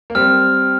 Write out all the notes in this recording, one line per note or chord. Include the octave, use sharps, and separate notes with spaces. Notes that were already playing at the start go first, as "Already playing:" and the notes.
A#3
G3 C4 F6